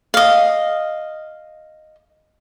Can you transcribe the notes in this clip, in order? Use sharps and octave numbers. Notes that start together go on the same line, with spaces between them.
D#5 F5